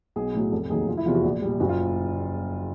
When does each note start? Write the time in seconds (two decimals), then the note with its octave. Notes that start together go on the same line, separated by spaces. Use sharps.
0.16 B1 G#4
0.34 A2 F#3
0.52 F1 A4
0.70 D#2 D#3 F#3 G#4
0.88 F1 F4
0.97 E4
1.06 E2 C3 F3 F4
1.15 F#4
1.24 A#1
1.42 A#2 G3
1.60 F#1 F#4
1.69 F4